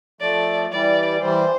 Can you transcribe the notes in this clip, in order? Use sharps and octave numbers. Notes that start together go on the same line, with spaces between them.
F3 A3 D5
E3 G3 D5
E3 G3 C5